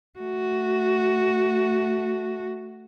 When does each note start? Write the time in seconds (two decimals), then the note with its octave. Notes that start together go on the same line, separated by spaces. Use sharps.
0.19 A3 F#4